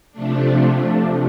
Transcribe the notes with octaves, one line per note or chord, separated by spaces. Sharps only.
C3 F3 A3 D4